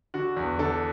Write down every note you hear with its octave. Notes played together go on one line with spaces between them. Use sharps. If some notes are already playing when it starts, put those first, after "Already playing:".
D3 F#4
E2
D3 A4